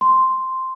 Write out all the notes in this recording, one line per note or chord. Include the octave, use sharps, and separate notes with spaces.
C6